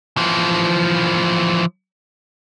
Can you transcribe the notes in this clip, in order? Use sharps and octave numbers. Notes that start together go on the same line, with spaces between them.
E3 F3